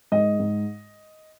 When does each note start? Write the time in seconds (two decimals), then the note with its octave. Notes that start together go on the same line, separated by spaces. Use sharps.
0.12 G#2 D#5
0.40 G#2